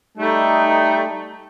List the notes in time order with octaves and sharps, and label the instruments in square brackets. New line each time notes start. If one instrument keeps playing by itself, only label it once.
[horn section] G3 A3 [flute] D#4